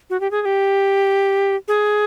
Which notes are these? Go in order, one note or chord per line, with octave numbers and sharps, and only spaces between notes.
F#4
G4
G#4
G#4
G4
G#4